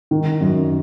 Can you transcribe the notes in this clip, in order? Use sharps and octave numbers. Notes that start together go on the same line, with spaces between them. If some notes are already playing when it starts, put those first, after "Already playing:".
D#3
F#2